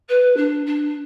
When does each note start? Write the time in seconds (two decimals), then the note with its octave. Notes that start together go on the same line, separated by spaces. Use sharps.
0.09 B4
0.36 D4
0.66 D4